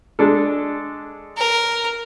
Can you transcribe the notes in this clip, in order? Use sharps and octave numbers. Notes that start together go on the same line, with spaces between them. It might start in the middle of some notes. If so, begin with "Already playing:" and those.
G#3 D4 A4
A#4